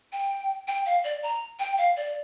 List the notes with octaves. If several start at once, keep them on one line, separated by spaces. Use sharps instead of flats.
G5
G5
F5
D5
A#5
G5
F5
D5